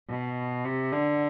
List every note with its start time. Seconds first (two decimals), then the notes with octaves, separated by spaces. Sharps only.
0.09 B2
0.65 C3
0.93 D3